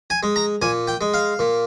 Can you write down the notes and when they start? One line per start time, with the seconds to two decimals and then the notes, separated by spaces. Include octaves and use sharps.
0.10 G#5
0.23 G#3
0.36 A#5
0.62 A#2 G#5
0.87 G5
1.01 G#3
1.14 F5
1.39 A#2